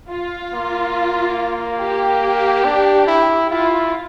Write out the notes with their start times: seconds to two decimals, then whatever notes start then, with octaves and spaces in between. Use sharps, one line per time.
0.10 F4
0.53 A#3
1.80 G4
2.65 D4
3.07 E4
3.50 E4 F4